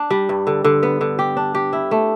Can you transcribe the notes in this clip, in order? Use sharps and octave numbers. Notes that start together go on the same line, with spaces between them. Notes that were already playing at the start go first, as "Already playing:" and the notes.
Already playing: D4
G3
G2
D3
D3
B3
D3
G4
D4
G4
E4
A3